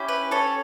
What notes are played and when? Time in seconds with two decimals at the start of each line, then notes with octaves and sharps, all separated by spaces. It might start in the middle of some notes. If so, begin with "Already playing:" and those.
Already playing: C#4 E4 G4
0.08 B4
0.31 A4 C#5